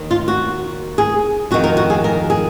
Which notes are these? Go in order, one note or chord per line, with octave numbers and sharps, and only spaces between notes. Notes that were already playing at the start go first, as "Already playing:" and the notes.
Already playing: D#2 D#3
F4
F#4
G#4
F2 D#3 F#4
A#4
F#4
G#4
A#4
G#4